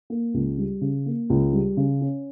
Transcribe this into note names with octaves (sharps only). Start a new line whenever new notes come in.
A#3
C#2
G3
C#3
A#3
C#2
G3
C#3
C#4